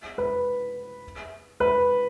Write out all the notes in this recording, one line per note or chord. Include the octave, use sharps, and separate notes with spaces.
B4
B4